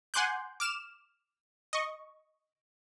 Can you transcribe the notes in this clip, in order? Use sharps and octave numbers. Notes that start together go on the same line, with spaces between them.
F#5 G#5 C6 D6 F#6 G6
D6 F6 E7
D#5 C#6